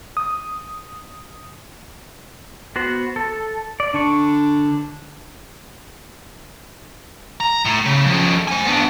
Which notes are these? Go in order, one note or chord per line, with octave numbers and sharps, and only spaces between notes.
D#6
B3 F#4 C5
A4
D5
D3 D4 C#6
A#5
A2
C#3
F3 C#4
C5 G#5
B3 D4